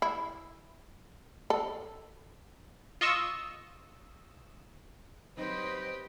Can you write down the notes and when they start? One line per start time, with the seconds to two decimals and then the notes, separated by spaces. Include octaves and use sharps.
0.02 E4
1.50 A4
3.01 F4 D#5 C#6 E6
5.37 F#3 C4 D#4 G4 B4 C5 D#5